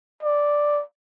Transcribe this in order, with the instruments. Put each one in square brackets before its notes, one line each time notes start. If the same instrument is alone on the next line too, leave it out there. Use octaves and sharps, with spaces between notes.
[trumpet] D5